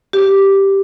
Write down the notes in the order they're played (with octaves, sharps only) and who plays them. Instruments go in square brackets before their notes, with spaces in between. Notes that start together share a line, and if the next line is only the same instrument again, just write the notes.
[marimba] G4